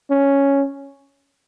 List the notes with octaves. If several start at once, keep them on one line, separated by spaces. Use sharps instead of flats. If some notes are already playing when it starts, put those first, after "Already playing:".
C#4